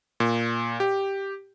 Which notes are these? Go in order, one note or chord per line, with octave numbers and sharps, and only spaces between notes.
A#2
G4